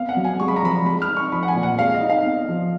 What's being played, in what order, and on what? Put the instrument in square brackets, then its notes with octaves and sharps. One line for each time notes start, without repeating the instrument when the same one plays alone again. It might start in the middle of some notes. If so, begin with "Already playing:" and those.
Already playing: [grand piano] B3 [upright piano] F5
[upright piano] F#5
[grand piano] F#3
[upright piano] G#5
[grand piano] G#3 [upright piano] C#6
[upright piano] B5
A#5
[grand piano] F3 [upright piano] B5
[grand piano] G#3 [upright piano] B5
[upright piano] F6
[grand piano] D#4
[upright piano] C#6
[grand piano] F3 [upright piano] B5
[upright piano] F#5
G#5
[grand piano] A#2
[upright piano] F#5
[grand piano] G#3 [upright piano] F5
[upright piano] D#5
[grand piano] D#4
[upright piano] F5
[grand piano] B3
F3